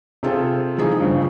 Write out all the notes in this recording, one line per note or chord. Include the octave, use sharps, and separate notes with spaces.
C3 C4 F4 G#4 A4
E3 F3 D#4 G#4
G2 C#3 F3